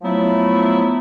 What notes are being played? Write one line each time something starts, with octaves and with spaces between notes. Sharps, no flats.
F3 F#3 A3 B3 E4